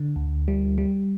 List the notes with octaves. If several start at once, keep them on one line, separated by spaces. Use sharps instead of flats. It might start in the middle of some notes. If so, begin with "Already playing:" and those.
Already playing: D3
D2
G3
G3